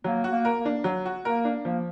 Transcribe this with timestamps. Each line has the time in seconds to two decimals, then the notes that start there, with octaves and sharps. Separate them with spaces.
0.04 F#3 A#3
0.24 F#4
0.31 A#3
0.45 A#4
0.58 A#3
0.65 D4
0.84 F#3
1.05 F#4
1.25 A#3 A#4
1.45 D4
1.65 F3 A#3